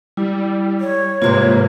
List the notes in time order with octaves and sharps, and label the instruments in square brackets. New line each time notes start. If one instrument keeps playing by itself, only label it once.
[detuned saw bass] G3 [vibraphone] E4
[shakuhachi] C#5
[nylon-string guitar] G#2 C3 E3 [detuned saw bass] A#3 [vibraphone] F4 C5 C6